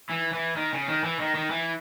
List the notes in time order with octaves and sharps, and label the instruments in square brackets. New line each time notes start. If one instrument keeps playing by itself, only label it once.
[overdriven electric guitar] E3
E3
D#3
C#3
D#3
E3
D#3
D#3
E3